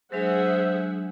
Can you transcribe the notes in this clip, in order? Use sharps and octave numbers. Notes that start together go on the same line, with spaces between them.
F#3 G#3 D4 G#4 C5 E5 F#5